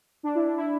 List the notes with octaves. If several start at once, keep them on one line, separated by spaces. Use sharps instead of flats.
D4
E4
D4
E4